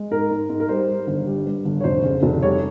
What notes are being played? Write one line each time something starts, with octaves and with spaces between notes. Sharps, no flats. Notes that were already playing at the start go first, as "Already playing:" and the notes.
Already playing: G#3
G#2 A#4
G#2
G#2
A#4
G3 C5
G3
G1
G3
G2
G1
C#5
F1 C5
C#3
F1
G3 C#5